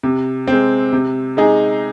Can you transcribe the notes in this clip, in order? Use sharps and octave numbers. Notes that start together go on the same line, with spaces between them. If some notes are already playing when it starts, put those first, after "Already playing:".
C3
G#3 C4
C3
G#3 D#4 G#4